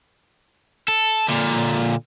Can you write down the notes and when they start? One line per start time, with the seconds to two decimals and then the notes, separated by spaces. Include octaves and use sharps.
0.88 A4
1.28 A#2 D3